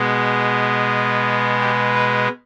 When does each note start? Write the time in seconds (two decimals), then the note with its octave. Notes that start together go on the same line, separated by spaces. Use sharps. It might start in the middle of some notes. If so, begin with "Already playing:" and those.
Already playing: B2 G#3 B3
1.61 G4
1.94 B4